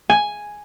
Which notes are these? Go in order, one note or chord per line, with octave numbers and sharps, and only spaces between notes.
G#5